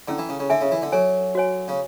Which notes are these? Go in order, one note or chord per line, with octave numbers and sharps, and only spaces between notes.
D3 C#4 E4 A4
E3
C#3
C#3
D3 A4 E5 G#5
C#3
E3
D3
F#3 A4 C#5 G#5
F#4 C#5 G#5
C#3